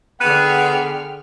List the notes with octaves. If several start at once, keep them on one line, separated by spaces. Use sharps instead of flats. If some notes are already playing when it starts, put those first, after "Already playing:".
D3 B3 G#4 G5 F6 F#6 D#7